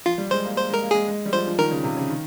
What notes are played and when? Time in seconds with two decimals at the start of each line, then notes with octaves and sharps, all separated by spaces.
0.06 F3 F4
0.18 G3
0.31 G#3 C5
0.45 A#3
0.56 A#3 C5
0.70 G#3
0.74 A#4
0.83 A#3
0.91 G#3 G#4
1.08 G#3
1.26 G3
1.33 F3 C5
1.47 F3
1.58 D#3 A#4
1.71 C#3
1.83 C3
1.97 C#3
2.10 D#3